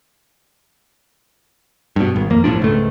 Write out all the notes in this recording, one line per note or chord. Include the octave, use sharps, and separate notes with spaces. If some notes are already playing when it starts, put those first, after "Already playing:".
G2 B2
G#1
F2 A#3
A#1 A2 F3 D4
C#2 G#2 A3